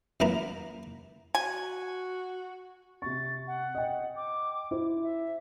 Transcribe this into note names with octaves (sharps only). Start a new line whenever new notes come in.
F#2 A#3 B3 E4 A#5 B5
F#4 G#5
C3 C#6 A6
F#5
D#5 G5
D6
E4 C5
E5